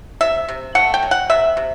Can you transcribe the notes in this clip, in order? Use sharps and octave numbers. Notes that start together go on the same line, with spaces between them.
C3 E5
C3
A3 F#5
G5
F#3
F#5
C3 E5
C3